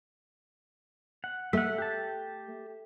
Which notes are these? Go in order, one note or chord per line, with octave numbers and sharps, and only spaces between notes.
F#5
A3 E5 F#5
G4 A5